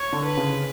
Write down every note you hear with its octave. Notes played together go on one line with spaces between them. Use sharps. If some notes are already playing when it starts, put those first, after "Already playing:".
Already playing: C#5
D3
B4
C#3